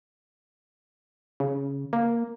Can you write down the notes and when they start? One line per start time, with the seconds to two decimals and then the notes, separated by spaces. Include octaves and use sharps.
1.40 C#3
1.93 A#3